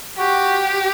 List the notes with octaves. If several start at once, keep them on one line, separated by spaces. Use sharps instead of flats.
F#4 G4